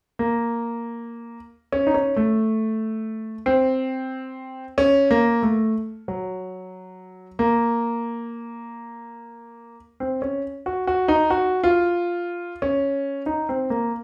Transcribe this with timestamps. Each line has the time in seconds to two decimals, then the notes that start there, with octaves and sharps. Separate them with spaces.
0.19 A#3
1.72 C#4
1.87 D#4
1.94 C#4
2.16 A3
3.46 C4
4.78 C#4
5.11 A#3
5.43 A3
6.08 F#3
7.39 A#3
10.00 C4
10.22 C#4
10.66 F#4
10.87 F#4
11.08 D#4
11.30 F#4
11.64 F4
12.62 C#4
13.26 D#4
13.49 C4
13.70 A#3